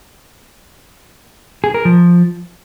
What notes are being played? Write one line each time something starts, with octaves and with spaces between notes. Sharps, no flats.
G#4
A#4
F3